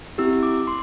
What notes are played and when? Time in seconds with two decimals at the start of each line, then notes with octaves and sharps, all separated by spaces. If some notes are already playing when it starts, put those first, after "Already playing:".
0.18 C4 E4 G4 E6
0.43 D6
0.67 C6